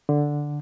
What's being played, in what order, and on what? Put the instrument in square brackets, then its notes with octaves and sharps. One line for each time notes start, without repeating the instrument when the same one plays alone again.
[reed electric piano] D3